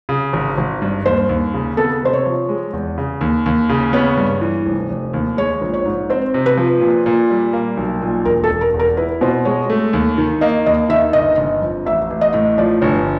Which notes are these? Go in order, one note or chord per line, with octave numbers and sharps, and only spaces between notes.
C#3
G#1
G#1
G2
D#2 C5
D#2
C#3
B3 A4
C3 C5
C#5
F3
G#3
E2
C#3
D#2
D#2
C#3
B3 C#5
G2
E3
F1
F1
D#2
G#3 C#5
A#1
C#5
G#2
C4 C5
C3
B4
F3
A#2
A#2
G3
A#3
B1
A#2
E1 A#4
A4
E1
A#4
E2
A#4
E4 B4
B2 C5
G#3 C#5
A3
D#2
D#3
A#3 D#5
D#2 D#5
D#3 E5
G1 D#5
G1
F2
A1 E5
A1
D#5
A2
F3 D5
G1 C#5